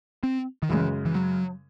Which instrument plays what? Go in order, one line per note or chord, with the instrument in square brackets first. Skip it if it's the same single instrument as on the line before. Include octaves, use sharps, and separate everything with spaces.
[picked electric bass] C4
D#3
[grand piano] F#2 C#3 G#3 [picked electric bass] E3
[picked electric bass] E3
F#3